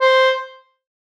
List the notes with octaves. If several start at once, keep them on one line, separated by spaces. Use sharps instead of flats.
C5